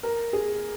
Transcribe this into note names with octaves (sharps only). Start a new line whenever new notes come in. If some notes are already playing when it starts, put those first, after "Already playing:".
A#4
G#4